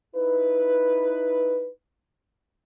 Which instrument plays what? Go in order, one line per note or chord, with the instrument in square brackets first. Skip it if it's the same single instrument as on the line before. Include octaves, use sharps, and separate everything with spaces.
[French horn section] D#4 E4 B4